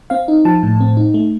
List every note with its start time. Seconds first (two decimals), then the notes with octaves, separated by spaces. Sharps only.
0.10 C4 F5
0.28 D#4
0.45 F3 A5
0.63 A2
0.80 C4
0.97 D#4
1.14 A3